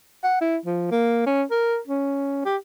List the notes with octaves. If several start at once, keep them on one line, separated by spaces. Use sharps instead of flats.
F#5
E4
F3
A#3
C#4
A#4
C#4
G4